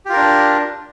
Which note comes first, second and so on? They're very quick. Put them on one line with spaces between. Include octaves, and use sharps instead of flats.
G4 F4 A#4 D4